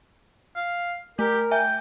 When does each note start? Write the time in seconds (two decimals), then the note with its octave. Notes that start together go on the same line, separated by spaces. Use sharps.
0.56 F5
1.19 A3 G4 A#4
1.51 E5 G5 G#5